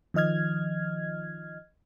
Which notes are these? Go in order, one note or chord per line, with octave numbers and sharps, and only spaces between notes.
D#3 F3 D#5 F6 G#6